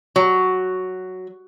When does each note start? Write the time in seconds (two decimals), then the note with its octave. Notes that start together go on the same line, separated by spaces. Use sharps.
0.16 F#3